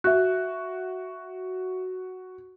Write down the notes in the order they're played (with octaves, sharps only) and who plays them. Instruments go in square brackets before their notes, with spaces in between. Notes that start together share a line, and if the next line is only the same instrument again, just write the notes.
[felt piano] F#4 [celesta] E5 F#6